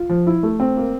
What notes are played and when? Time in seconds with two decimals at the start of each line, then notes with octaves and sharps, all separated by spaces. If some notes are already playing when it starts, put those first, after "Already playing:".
Already playing: F4
0.09 F3
0.27 E4
0.43 A3
0.60 C4
0.77 A#3